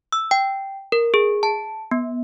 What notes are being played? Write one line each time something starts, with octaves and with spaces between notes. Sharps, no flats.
E6
G5
A#4
G#4
A5
B3